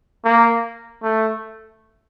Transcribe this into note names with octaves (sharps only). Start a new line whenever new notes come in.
A#3
A3